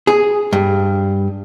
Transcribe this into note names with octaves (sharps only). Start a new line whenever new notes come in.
G#4
G2